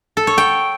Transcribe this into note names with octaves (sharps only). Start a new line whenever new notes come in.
A4
C#5
G5